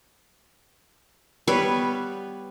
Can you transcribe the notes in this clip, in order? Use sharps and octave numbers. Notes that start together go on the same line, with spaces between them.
G3 B3 B4 C#5